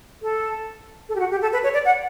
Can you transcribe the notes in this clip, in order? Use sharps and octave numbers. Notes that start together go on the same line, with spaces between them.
A4
A4
G4
F#4
G4
A4
B4
C#5
D5
F#5